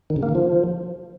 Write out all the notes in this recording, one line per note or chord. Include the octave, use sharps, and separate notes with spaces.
D#3
C#3
A#3
D#3
F3